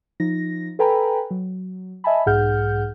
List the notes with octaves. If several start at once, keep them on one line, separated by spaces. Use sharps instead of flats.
F3 D#4 A#6
A4 B4 G5 G#5 A#5 B5
F#3
D#5 E5 G#5 A5 B5
B1 G#2 G#4 F#5 F6 G6